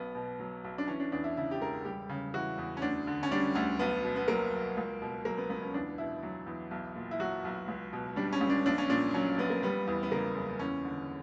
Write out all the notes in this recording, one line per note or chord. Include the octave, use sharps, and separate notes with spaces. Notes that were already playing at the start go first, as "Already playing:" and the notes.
Already playing: B1 B3
B2
F#3
B1
D4
E3 C#4
D4
E2 D4
E4
C#3 E4
G4
E1 A#4
G3 G4
C#3
E3 F#4
E2
C#4
D2 D4
D3
C#4
G3 D4
D2 C#4
B1 B3
B2
B3
F#3 A#3
B1
C#2
B2
F#3 A#3
B3
C#2 B3
C#4
E2 D4
B2 E4
F#3
E2
B1
A#2
E4
F#3 F#4
B1
C#2
B2
G3 D4
C#4
C#2
D4
A#1 D4
C#4
A#2 D4
F#3 C#4
A#1 B3
A#3
G3 B3
E2
B3
C#3 A#3
F#1
E2 C#4
D3